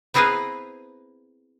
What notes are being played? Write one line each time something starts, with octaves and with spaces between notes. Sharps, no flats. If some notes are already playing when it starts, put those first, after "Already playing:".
B3 C4 E4 G#4 A#4 B4